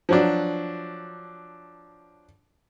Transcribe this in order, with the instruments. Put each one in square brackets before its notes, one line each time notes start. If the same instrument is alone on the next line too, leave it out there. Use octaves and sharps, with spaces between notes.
[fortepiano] F3 F#3 D4